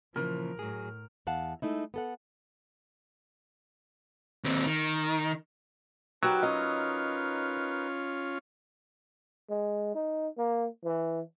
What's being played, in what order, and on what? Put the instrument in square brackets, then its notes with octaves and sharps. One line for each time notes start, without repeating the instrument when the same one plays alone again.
[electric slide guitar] A#2 C#3 E3 [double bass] F3 [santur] A#4
[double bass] A2 [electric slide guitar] F#3 G#4
[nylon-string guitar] E2 F5 F#5 A5
G#3 A3 D#4 E4
B3 A4 F#5
[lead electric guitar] D#2 C4
D#3
[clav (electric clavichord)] F#3 [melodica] D#4 A#4 B4 [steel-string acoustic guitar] F#4 G4
[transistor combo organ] C#4 F4 [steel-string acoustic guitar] D#5
[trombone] G#3
D#4
A#3
E3